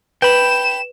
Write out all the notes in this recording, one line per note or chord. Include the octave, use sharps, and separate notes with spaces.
B4 G5 B5 E7